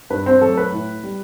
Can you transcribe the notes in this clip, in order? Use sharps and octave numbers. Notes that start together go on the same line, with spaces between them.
G2 B4
C4 C5
F#3 A3 A4
B4
A2
G3